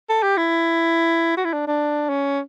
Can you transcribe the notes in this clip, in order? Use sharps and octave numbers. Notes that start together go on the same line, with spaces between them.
A4
G4
E4
F#4
E4
D4
D4
C#4